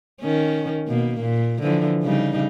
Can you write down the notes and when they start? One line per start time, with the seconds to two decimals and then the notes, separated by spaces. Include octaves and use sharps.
0.21 D#3 C#4
0.87 B2 A#3
1.21 A#2
1.62 D3 E3 F3
2.03 C#3 G3 D#4